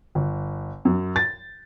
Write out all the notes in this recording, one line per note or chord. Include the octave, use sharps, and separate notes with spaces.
G1
F#2
A6